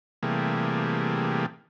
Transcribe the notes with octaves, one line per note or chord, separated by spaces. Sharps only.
C3 E3 G3 A3 A#3 G#4